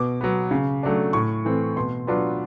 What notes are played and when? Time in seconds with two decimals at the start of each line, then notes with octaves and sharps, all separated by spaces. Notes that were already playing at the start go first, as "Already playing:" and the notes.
Already playing: B2 D6
0.21 F#3 B3
0.51 C#3
0.83 F#3 A3 D4
1.13 A2 C#6
1.45 E3 A3 C4
1.76 B2 C6
2.07 F#3 B3 D4 F4